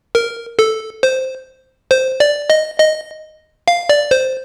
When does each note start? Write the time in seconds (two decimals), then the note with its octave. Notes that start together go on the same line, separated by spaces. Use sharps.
0.15 A#4
0.59 A4
1.03 C5
1.91 C5
2.20 D5
2.50 D#5
2.79 D#5
3.68 F5
3.89 D5
4.11 C5